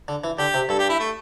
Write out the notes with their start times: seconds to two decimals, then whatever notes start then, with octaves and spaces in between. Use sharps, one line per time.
0.08 D3
0.24 E3
0.39 D3 G4
0.54 C3
0.69 G2 A4
0.79 G4
0.89 E4
0.99 A3